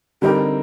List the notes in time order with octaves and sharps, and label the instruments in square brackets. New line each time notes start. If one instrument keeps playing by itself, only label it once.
[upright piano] D3 G3 C4 D#4 A#4 [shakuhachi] G4